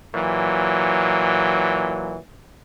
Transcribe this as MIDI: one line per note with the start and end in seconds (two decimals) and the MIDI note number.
0.14 2.17 46
0.14 2.17 52
0.14 2.17 54